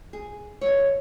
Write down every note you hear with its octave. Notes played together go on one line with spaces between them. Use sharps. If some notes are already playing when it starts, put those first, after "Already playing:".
G#4
B2 F#3 E4 C#5